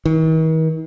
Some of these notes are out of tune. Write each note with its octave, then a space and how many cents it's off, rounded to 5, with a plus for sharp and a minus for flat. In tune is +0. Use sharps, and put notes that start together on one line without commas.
D#3 +45